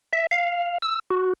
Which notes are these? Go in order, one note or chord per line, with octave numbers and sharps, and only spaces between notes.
E5
F5
E6
F#4